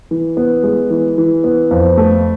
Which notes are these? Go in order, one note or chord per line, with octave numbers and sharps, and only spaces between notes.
E3
B3
G#3
E3
E3
B3
F2
A3